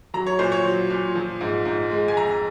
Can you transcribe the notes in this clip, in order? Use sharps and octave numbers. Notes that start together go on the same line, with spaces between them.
F#3 A#5
C#5
A#2 C5
C#5
F#3
A#2
F3
G#2
G#2
G#3
G#5
F2 A#5